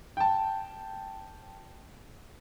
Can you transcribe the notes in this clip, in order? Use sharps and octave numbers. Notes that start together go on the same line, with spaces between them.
G5 A5